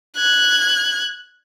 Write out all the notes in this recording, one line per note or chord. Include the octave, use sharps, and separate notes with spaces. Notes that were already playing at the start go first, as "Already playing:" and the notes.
F#6 G#6